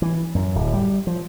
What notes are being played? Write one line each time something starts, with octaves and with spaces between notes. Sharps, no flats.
E3
F#2
D1
G3
F3